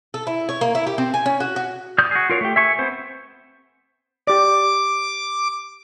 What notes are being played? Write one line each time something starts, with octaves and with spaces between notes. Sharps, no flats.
A4
E4
C#5
A#3
E4
G4
C4
G#5
C#4
F#4
F#4
D5 D#6 F6 G6
F#4 G#4
F4 A#4 C#5
A3 G4
E5 G#5 C#6
B3 C4 C5
G4 D5 D6